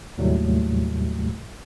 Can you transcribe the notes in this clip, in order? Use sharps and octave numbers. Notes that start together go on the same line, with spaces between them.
D#2 A2 C3 F#3 G3 A3